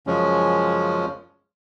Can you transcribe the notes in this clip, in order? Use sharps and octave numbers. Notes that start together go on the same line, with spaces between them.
F#2 C#3 F3 G#3 C#4